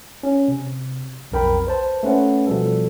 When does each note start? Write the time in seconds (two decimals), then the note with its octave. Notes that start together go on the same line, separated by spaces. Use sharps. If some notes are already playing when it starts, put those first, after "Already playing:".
0.23 C#4
0.48 C3
1.32 B1 F2 A#4 G5 B5
1.67 B4 C5 A5
2.03 A3 C#4 B4 F#5
2.47 B2 F3 G3 A4